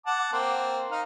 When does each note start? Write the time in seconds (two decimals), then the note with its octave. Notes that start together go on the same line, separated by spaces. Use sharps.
0.06 F#5 A5 D6
0.33 A#3 C4
0.91 D#4 F5